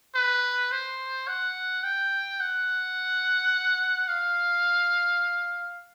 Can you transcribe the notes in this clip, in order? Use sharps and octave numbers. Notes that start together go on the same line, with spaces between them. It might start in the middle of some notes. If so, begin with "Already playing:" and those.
B4
C5
F#5
G5
F#5
F5